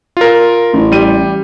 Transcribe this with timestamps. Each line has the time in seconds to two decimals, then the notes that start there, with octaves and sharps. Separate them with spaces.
0.17 F4 A#4
0.73 A1
0.92 G3 D#7